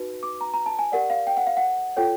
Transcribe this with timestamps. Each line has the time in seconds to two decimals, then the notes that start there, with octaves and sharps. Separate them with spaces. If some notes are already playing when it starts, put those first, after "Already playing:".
Already playing: D#4 F#4 B4
0.23 D6
0.41 A#5
0.54 A#5
0.66 A5
0.79 G#5
0.92 G4 A#4 D5 F#5
1.10 F5
1.27 G5
1.37 F#5
1.47 F5
1.57 F#5
1.97 F4 A4 C#5 G5